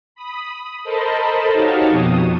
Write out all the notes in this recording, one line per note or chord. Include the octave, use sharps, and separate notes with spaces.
B5 D#6
A4 A#4 C5 D#5 A5 B5
D#4 F#4 G4 C#5 F5 A5
F2 B2 D#6